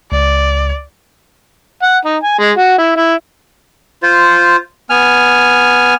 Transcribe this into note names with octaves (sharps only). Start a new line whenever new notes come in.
C#2 D5
F#5
D#4
G#5
G#3
F#4
E4
E4
F4 C5
B3 G#5 F6